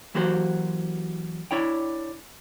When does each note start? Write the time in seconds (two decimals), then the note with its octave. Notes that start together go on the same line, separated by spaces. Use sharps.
0.15 E3 F#3 A#3 F#4 G4 C5
1.51 D4 E4 C#5 G5